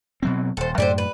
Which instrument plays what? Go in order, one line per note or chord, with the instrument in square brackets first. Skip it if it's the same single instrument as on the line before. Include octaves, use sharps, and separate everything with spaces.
[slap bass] B2 F#3 C4
[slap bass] D#1 [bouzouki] A4 C5
[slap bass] F#2 A2 [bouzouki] D3 G4 C5
[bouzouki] B4